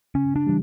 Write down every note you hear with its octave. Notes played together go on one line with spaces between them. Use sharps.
C#3 C#4
D4
E3 G3